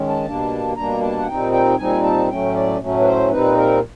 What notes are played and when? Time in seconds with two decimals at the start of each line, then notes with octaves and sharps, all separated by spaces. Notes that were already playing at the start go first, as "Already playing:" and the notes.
Already playing: D#3 G#3 C#4
0.09 A5
0.25 B2 G3 A#3 D4
0.76 B2 G3 A#3 D4 A#5
1.02 A5
1.19 F#5
1.27 A#2 G3 C4 D#4 G5
1.52 G5
1.78 A#2 G3 C4 D#4 G#5
2.04 A5
2.29 A2 F#3 A3 C#4 G5
2.55 D5
2.80 A2 F#3 A3 C#4
3.00 B4
3.05 C5
3.31 A#2 G3 C4 D#4 B4
3.57 A#4